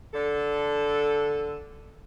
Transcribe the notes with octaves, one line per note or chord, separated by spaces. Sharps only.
D3 A4